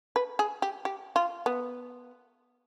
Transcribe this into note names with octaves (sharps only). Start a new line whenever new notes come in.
B4
G#4
G4
G4
F4
B3